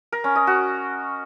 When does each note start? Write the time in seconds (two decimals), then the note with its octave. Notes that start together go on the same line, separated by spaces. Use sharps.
0.12 A#4
0.24 C#4
0.36 D#5
0.47 F#4